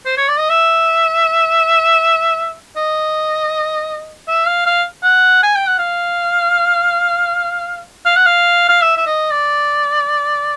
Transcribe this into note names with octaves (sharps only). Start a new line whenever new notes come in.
C5
C#5
D5
D#5
E5
D#5
E5
F5
F5
F#5
G#5
G5
F#5
F5
F5
F#5
F5
F5
E5
E5
D#5
D5